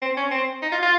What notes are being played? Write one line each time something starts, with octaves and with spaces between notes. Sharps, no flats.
C4
C#4
C4
D#4
F4
F4